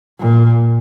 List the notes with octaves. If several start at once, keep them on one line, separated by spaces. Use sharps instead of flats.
A#2